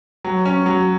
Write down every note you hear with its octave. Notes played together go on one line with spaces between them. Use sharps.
F#3
C#4
F#3